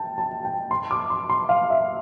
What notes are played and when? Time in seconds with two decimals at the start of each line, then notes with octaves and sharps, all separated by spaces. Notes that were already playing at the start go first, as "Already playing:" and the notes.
Already playing: G5 A5
0.18 A5
0.45 G5
0.71 C6
0.91 D6
1.10 C6
1.30 C6
1.49 F5
1.70 E5